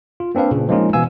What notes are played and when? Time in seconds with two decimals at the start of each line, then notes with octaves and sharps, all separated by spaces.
0.20 F4
0.35 A#3 C4 D4 B4 F5
0.51 A#2 C#3
0.69 F3 G#3 A#3 C#4 D#4 F4
0.93 B2 E3 B3 F5 G#5 E6